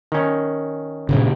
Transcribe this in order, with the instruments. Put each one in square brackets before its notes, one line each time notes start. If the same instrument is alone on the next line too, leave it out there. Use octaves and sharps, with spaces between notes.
[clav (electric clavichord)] D#3 C#4
[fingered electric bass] G2 A#2 C#3